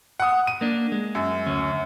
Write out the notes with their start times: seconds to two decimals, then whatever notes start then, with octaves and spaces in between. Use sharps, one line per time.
0.20 F#5 D#6
0.47 D#7
0.61 A#3 D4
0.92 G#3
1.15 F#2
1.46 D2 C#4